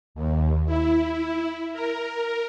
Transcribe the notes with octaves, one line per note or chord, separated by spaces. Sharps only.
D#2
E4
A#4